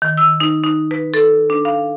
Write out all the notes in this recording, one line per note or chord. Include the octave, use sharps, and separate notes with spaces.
D#3
E6
D#4
D#4
B4
A4
D4
F5